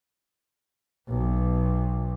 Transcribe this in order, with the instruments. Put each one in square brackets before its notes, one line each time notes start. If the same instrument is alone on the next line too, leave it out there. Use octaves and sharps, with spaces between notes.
[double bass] B1